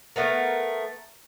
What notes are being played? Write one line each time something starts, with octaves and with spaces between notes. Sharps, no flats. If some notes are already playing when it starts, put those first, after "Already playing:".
A3 B3 A#4